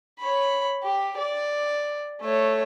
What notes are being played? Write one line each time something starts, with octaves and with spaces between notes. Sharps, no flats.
C#5 B5
G4
D5
A3 C#5